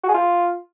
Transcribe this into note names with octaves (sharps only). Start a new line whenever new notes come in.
F#4
G#4
F4